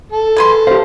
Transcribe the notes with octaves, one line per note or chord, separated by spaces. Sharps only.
A4
G#4 B4 C6
G4 C5 F5